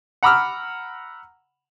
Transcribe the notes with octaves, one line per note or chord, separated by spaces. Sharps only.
F#5 A#5 B5 D6 E6 F6